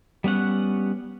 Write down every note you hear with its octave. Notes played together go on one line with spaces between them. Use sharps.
G3 B3 C#4 F#5